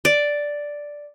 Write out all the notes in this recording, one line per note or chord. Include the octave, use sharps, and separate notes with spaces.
D5